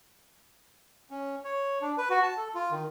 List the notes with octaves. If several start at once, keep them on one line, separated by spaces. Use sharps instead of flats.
C#4
C#5
D4
B4
F#4
A5
A4
F4
D#3